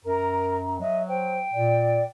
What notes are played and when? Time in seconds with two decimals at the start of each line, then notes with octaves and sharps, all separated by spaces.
0.05 F#2 A#4 A#5
0.80 F#3 D#5 E5
1.08 C5 G5
1.54 A#2 D5